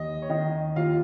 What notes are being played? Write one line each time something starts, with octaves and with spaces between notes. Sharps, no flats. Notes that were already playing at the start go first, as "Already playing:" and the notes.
Already playing: D#2 D#5
C#5
D#3 D#5
D#2 F4 F5